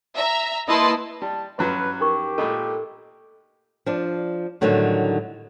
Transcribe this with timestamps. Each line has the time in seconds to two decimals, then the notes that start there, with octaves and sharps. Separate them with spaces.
0.16 E5 A#5
0.67 A#3 E4 B4 D#5 A5 C6
1.22 G3 A5
1.59 G2 F#3 C#4 E4 F#4 B4 C#5
2.00 D#4 G4 A#4 C#6
2.38 A#2 G#3 A3 A4 D#5 B5
3.86 F3 D4
4.61 A2 D3 D#3 F#3 G3 D#4